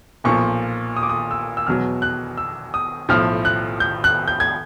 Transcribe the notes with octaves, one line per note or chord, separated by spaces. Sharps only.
B1 A#2 F3 C#6
D#6
D6
D#6
E6
E6
E2 B2 F#3 F6
F#6
E6
D#6
B1 A2 F3 F6
F#6
G6
F#6
G6
G#6